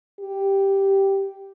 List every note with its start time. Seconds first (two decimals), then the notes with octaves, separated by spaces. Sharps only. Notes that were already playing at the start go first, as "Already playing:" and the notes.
0.20 G4